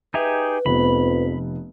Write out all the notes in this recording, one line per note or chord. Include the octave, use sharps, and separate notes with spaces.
D#4 G4 G#4 B4 E5
F1 F2 B3 B5